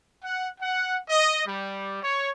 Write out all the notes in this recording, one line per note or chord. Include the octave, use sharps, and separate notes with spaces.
F#5
F#5
D#5
G3
C#5